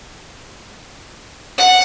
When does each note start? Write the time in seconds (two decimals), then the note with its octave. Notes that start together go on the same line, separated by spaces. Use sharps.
1.58 F#5